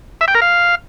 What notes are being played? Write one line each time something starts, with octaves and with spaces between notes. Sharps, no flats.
E5
G5
A#4
F5